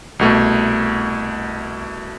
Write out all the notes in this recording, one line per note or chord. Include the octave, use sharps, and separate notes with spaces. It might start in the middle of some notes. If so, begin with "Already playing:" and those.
C2 B2 A3